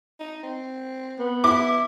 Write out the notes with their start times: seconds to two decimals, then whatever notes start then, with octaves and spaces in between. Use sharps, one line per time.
0.20 D#4
0.43 C4
1.19 B3
1.44 E4 D6